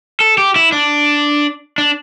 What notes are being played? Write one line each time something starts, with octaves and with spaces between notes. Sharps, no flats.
A4
G4
E4
D4
D4